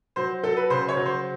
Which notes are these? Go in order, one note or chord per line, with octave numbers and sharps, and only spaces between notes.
F#3 C5
F#3 A4
B4
C#3 C5
C#5
F#3
C5